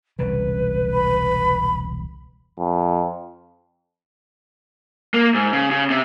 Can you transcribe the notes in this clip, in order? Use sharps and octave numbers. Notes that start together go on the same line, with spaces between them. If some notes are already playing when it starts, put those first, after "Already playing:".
E1 C2 C#3 B4
B5
F2
A#3
G#2
C#3
C#3
C3